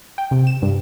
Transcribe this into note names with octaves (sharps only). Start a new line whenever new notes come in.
G5
C3
E7
G2